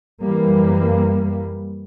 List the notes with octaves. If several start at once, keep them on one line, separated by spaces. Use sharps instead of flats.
F#2 E3 G3 A#3